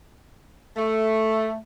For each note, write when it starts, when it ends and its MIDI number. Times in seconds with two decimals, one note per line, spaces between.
0.76 1.56 57